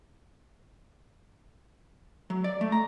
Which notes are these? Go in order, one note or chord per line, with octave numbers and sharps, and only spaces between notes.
F#3
D5
A3
A#5